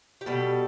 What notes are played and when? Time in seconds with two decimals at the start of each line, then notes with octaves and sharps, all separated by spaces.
0.21 G4
0.26 B2 G3 A4